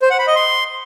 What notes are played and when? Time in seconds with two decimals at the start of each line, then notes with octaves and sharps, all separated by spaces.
0.02 C5
0.11 F#5
0.19 B5
0.27 D#5
0.36 C6